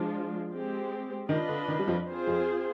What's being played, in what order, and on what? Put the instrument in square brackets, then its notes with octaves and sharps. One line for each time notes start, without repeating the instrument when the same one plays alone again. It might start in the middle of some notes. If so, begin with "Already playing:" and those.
Already playing: [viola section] F3 G#3 D4 F4
G#3 C4 G4
[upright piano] D#3 [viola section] D4 F4 B4 D#5
[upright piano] D3
D#3
G3
F2 F3
[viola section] C4 F4 G#4 C5
[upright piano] F2 F3